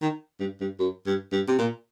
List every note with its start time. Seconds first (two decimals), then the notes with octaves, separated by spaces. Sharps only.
0.02 D#3
0.40 G2
0.61 G2
0.79 F#2
1.06 G2
1.32 G2
1.48 C3
1.59 A#2